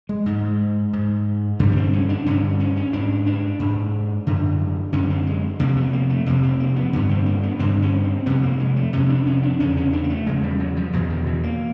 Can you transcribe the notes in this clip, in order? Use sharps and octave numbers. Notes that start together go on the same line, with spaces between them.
G#3
G#2
G#2
G2 D3 G3
B3
C4
C#4
D4
G2 D3 C#4
C#4
C#4
G#2 D4
D4
G#2
F#2 D3
F#2 D3 C#4
C4
G#3
F2 C3 A#3
B3
A#3
A3
F2 C3 A#3
C4
A#3
B3
G2 D3 B3
C4
A#3
B3
G2 D3 C4
C#4
C4
F2 C3 B3
A#3
G#3
A3
F2 C3 C#4
D4
C#4
D4
E2 C#3 C#4
C#4
D4
A#3
A3
E2 C#3 G#3
G3
F#3
F3
E2 B2 E3
D#3
E3
A#3